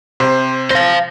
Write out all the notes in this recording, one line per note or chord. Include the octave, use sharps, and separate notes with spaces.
C3 C5
C5 F5 A#6